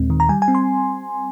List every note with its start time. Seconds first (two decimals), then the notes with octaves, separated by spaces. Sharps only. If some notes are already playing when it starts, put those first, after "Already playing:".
Already playing: D#2 A#2 G#3 C4
0.10 D#3
0.20 A#5
0.29 G3 G#5
0.42 G#5
0.48 C4
0.55 C6